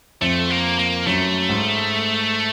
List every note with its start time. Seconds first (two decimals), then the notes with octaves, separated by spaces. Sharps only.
0.21 F2 A3
0.50 A#3
0.79 A#3
1.07 F#2 A3
1.49 G#2